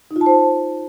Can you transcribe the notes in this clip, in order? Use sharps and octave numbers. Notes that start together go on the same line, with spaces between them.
D#4
F4
A5
C5